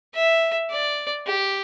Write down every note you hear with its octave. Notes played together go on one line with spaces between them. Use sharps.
E5
D5
G4